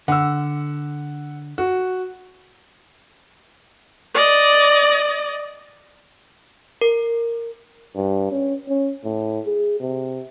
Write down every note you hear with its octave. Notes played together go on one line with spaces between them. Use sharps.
D3 F#5 E6
F#4
D5 D#5
A#4
G2
C#4
C#4
A2
G#4
C3